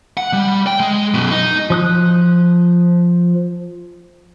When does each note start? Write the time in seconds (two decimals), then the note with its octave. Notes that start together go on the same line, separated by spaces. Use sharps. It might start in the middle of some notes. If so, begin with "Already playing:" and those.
0.17 F#5
0.33 G3
0.67 G5
0.80 G#3
1.14 F#2 B2
1.31 D#4
1.70 F3 D#6 F#6